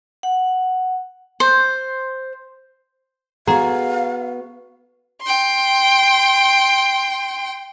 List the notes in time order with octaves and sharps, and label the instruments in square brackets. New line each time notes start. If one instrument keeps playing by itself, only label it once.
[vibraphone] F#5
[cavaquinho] C5
[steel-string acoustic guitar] B3 F#4 [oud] G#4 [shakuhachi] F5 [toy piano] A#5 C6
[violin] G5 C6